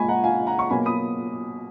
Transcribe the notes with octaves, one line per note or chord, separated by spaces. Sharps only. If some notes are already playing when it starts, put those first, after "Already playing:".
Already playing: A#2 G#3 G#5 B5 C#6
F#5 A#5
F5 G#5
F#5 A#5
C#6
B2 F#3 A#3 G#5 B5
B5 D#6